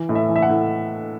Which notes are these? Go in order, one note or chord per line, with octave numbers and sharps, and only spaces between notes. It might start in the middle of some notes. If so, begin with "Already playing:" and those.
Already playing: E3
A2
E5
E3
E5
F#5
A2